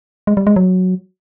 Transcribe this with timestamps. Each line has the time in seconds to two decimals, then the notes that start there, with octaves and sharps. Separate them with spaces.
0.27 G#3
0.37 G3
0.47 G#3
0.56 F#3